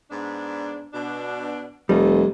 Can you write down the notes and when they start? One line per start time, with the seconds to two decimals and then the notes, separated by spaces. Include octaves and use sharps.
0.11 G#2 B3 D4
0.93 B2 D4
1.89 F1 G#2 G3 A3 D#5